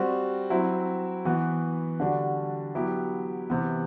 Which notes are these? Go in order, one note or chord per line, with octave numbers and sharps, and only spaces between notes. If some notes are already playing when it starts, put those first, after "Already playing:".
Already playing: G3 C4 F#4
F#3 C4 E4
E3 B3 F#4
D3 G3 D4 F#4
F#3 B3 E4 G4
C3 E3 B3